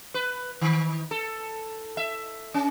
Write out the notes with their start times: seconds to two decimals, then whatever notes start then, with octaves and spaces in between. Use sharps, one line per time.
0.14 B4
0.61 D#3
1.11 A4
1.97 E5
2.54 C#4